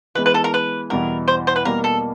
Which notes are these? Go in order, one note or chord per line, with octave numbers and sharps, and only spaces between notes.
E3 G#3 B3 E4 B4
B4
A4
A#4
B4
E2 B2 G3 B3 E4 A#4
C5
C5
B4
B2 G3 A#3 A#4
A4